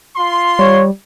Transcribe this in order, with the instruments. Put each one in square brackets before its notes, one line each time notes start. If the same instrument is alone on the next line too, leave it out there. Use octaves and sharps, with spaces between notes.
[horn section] F4 C6
[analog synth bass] G3 [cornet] C#5